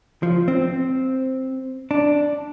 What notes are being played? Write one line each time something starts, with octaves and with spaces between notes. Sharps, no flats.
F3
C4
D4